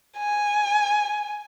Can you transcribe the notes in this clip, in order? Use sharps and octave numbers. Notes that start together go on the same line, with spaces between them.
G#5